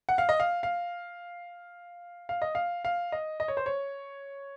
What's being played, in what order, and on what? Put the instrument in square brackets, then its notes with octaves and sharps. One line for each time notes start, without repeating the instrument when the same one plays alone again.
[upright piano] F#5
F5
D#5
F5
F5
F5
D#5
F5
F5
D#5
D#5
C#5
C5
C#5